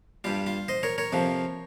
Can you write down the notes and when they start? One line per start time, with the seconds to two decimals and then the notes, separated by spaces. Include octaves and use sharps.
0.24 G2 G3 F4
0.46 F4
0.68 C5 D#5
0.83 A#4 C#5
0.98 A#4 C#5
1.12 F2 C3 F3